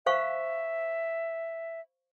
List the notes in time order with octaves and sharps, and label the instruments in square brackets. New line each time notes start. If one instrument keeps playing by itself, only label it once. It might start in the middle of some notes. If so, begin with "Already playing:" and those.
[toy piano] C5 F5 C#6 [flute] E5